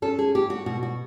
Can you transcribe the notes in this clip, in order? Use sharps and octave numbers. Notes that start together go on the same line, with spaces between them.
C#4 A4
G#4
A3 G4
F#4
B2 F#4
F#4